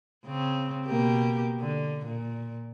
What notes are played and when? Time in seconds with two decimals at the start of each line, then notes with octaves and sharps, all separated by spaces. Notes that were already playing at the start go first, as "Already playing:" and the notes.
0.25 C#3 C4
0.86 B2 A#3 G4
1.59 D3
2.05 A#2